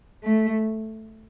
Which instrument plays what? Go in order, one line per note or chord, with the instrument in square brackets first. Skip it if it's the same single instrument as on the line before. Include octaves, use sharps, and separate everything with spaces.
[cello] A3